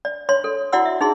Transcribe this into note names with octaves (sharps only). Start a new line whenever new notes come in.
D5
C#5 C6
A4
E4 F#4 D5 F#5 C6 E6
E5
D#4 G#4 C6